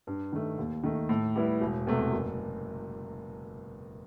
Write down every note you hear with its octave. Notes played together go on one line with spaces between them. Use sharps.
G2
D#3 A3
D#2
D#3 A3
A2
G3 B3 E4
E1
E2 C3 E3 A3
F#1